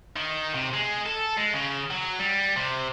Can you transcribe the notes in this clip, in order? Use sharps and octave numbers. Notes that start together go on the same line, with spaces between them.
D#3
C3
G#3
A4
G#3
C#3
F#3
G3
C3